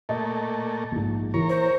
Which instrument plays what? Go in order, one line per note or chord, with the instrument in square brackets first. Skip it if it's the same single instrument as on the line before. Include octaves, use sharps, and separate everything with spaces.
[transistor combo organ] A#2 A3 [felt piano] D#5
[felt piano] A#1 G#2
[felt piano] E3 [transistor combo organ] A#4 C#5
[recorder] C5